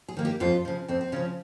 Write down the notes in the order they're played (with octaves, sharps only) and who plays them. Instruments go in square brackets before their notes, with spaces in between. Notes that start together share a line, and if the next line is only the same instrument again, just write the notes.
[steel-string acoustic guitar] G#4
D#3 A#3
G4
F2 F4
C#3 F3
F2 C4
C4
C#3 C#4
F3